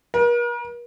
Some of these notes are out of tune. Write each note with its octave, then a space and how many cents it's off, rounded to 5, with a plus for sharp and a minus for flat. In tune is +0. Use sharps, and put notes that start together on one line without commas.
A#4 +45